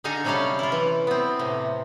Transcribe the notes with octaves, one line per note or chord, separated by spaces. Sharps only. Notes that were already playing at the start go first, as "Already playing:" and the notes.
D3 D#4 A4 F5 G#5 A#5
C3 F#3 G3 C#4 A4 F5
E4 F4
E3
B3 C4
A2 C3